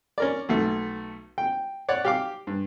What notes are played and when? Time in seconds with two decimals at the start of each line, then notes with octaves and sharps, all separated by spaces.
0.18 C#4 A#4 D5
0.49 B1 A3
1.38 G5
1.89 C#5 D5 F#5
2.05 G4 F5 D6
2.47 G2